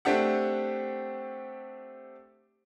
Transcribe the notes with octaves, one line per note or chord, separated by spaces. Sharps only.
A3 C4 D4 G4 F#5